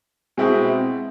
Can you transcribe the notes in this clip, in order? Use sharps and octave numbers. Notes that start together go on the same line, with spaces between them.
B2 G#3 C4 E4